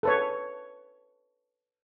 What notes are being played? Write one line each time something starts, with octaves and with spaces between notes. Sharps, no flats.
A4 B4 C#5